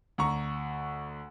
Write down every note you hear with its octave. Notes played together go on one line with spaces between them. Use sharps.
D2 A#5 C#6